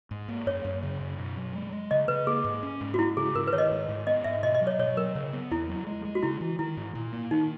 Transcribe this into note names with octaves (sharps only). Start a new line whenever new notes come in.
G#2
A#3
F#2 C#5
F#2
C#3
F#2
B2
F#3
G#3
G#3
C#3 D#5
C#3 B4
A#3 G#4
G#2
C#4
G#2
F#4
G#3 E4
C#3 G#4
G#2 A#4
B4
D#3 C#5
D#5
G#2
G#2
B3 D#5
G#2 E5
B2 D#5
D#5
F#3
C#5
B2 C#5
F#3 A#4
C#3
B3
E2 E4
F#3
G#3
G#3
F#4
C#3 E4
E3
D#3 E4
G#2
A#2
A#3
D#3 D#4